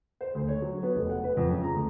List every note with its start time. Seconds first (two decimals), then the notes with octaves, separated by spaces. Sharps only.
0.21 C5
0.35 D2
0.48 C#5
0.62 F#3
0.83 B3
0.96 F1
1.09 F#5
1.24 B4
1.37 F2
1.51 C#3
1.64 A#5
1.75 D2